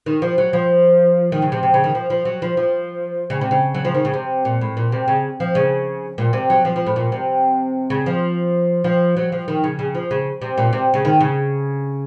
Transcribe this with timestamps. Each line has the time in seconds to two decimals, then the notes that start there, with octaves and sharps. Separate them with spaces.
0.06 D#3
0.22 F3
0.38 F#3
0.53 F3
1.32 D#3
1.42 C#3
1.52 C3
1.63 C3
1.74 C#3
1.84 D#3
1.95 F3
2.10 F3
2.25 F#3
2.42 F3
2.57 F3
3.30 C#3
3.41 C3
3.51 C#3
3.75 F#3
3.85 F3
3.94 D#3
4.05 C#3
4.14 C3
4.45 A#2
4.61 A2
4.77 A#2
4.92 C3
5.08 C#3
5.40 F3
5.55 C#3
6.18 A#2
6.33 C3
6.50 F#3
6.65 F3
6.76 F3
6.87 A2
6.96 A#2
7.12 C3
7.90 C#3
8.06 F3
8.84 F3
9.17 F#3
9.32 F3
9.48 D#3
9.64 C#3
9.79 C#3
9.95 F3
10.11 C#3
10.42 C3
10.58 A#2
10.73 C3
10.94 C#3
11.05 D#3
11.21 C#3